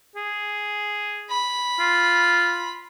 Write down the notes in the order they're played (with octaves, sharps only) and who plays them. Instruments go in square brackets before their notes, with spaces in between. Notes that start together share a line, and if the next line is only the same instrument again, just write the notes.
[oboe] G#4
[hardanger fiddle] B5
[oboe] F4